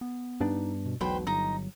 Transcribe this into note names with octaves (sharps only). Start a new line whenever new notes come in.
B3
G2 B3 D4 D#4
B2
E1 B1 B2 F#3 B4 C5 G5
G1 D#4 A#5